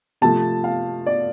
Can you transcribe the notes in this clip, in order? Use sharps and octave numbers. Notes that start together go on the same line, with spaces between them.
C3 F3 A3 A5
F5
D5